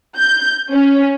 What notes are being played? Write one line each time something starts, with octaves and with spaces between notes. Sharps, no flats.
G6
C#4